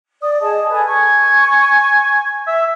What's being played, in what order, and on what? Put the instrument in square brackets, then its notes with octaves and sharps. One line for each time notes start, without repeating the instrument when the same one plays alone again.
[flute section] D5 [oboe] D#6
[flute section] G#4 D#5 A5
A4 B4 G#5
[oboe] G#5 [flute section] C#6
[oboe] E5